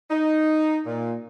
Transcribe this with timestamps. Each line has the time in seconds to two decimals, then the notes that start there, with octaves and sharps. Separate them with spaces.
0.11 D#4
0.86 A#2